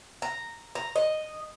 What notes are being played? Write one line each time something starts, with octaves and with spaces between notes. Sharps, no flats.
A#5
A#5
D#5